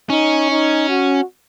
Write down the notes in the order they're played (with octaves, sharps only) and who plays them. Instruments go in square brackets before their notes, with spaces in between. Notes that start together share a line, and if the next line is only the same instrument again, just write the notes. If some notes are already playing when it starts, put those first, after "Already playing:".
[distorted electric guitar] C#4 [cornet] D#4
[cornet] D#4
F#4